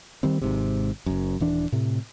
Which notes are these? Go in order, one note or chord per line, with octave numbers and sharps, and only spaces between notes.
D#3 G3 C4
G#1 G#2 C3
F#1 F#2
D#1 E3 D4
A2 C3